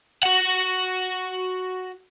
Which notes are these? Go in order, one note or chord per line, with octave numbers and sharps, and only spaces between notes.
F#4 F#5